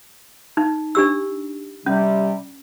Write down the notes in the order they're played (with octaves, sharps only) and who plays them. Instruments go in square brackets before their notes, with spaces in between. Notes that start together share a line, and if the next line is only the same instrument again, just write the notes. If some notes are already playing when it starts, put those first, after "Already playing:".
[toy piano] D#4
D4 G4 E6
[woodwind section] C3 G3 [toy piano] C#4